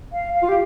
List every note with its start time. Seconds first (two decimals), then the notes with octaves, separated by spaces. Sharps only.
0.14 F5
0.35 F5
0.42 F4
0.49 G4